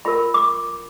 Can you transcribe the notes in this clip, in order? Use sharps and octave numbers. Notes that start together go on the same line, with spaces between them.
F4 A#4 B5
D6